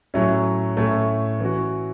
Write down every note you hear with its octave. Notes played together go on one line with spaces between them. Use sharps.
A2 F#3 A3 C#4 E4
A2 A3 C#4 E4
E3 C#4 F#4